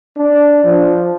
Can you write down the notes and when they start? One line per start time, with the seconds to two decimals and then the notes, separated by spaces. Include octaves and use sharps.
0.17 D4
0.64 F3